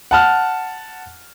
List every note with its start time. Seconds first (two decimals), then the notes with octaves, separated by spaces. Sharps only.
0.11 F#5 A5 F6